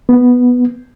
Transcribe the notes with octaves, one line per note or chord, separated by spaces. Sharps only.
B3